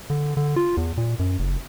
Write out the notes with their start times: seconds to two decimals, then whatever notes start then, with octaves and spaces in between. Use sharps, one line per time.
0.10 D3
0.37 D3
0.56 F4
0.77 E2
0.97 A#2
1.19 F#2
1.39 F#1